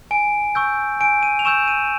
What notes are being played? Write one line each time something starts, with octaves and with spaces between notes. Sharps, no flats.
G#5 D7
C#6 E6 G6
G#5 D7
D#7
F7
C#6 E6 G6 E7
D#7